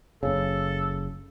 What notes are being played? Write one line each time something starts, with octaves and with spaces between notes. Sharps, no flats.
F#1 C#3 A4